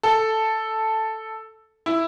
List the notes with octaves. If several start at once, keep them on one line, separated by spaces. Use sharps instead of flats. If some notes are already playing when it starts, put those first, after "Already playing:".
A4
E4